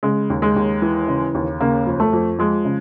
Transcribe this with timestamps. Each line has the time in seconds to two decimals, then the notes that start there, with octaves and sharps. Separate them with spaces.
0.03 C#3 G#3
0.30 D#2
0.42 G#3
0.56 D#2
0.82 E3
1.08 C#3
1.35 D#2
1.61 C#3 A#3
1.87 F2
2.00 A3
2.13 F2
2.39 F3 G#3
2.65 C#3